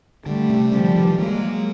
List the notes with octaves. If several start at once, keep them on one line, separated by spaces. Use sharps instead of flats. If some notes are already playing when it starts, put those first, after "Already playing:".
D3 G3 A3
C3
C#3 F3 G3
D3
D#3
E3
F#3 G#3 A#3